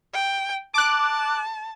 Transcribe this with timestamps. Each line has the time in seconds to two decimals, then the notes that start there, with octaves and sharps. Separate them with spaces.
0.13 G5
0.74 A5 D6 F#6